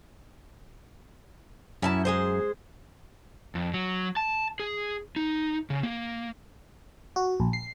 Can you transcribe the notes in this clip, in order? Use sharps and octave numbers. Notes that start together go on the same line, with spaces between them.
F#2 C#4 E4 A5
G#3 G#4 C5
F2
F#3
A5
G#4
D#4
C#3
A#3
F#4
A#1
C7